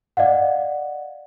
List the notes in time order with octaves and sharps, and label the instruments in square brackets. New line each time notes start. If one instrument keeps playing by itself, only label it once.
[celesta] D5 D#5 F5 F#5